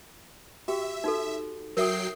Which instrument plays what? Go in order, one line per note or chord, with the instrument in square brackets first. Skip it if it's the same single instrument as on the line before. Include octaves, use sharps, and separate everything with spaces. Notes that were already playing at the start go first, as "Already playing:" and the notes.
[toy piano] F#4 G4 G5 [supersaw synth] E5
[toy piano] D#4 F#4 A4
[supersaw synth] F#3 G5 C7 [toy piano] A#4 E5 D#6